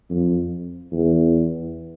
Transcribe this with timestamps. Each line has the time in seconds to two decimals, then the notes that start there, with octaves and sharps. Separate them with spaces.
0.10 F2
0.92 E2